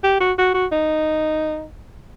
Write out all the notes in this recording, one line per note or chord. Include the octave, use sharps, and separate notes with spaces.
G4
F#4
F#4
F#4
D#4